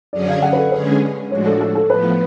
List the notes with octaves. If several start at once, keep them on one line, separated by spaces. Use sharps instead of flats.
F#2 D3 F#3 C#4 G#4 D5
F5
F#5
B4
A4
D3 G#3 C#4 G#4 B4
A2 F3 G#3 D4 F#4 C#5
A4
A4
A4
A2 F3 B3 B4